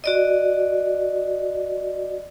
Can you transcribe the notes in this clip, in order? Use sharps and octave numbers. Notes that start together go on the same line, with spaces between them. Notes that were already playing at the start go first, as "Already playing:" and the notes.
F#4 D5 D#5